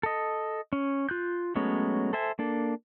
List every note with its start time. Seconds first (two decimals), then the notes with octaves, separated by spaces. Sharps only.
0.03 A4 D#5
0.73 C#4
1.09 F4 F#6 G6
1.56 F#3 G#3 A3 B3 C#4
2.13 A4 C5 E5 G#5
2.39 A#3 D4 A4